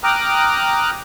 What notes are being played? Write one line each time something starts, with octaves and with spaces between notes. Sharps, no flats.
G5 A#5 D6 D#6 F6 F#6